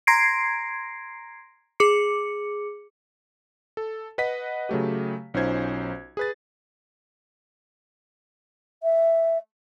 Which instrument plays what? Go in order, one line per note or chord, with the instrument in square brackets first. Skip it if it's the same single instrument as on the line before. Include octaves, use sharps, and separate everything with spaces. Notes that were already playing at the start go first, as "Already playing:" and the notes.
[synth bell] A#5 C6 G#6 A#6 C7 D7
G#4 D6 C#7
[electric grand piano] A4
B4 D#5 F#5 B6
C#3 F#3 A3 G4
B1 C#4 D#4 F4 C5 G#6
G#4 B4 A6
[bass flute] E5